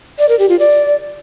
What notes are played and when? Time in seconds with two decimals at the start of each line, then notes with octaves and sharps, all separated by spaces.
0.19 D5
0.29 A#4
0.39 G4
0.49 F4
0.59 D5